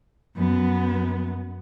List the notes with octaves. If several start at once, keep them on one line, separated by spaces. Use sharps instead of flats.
F#2 B3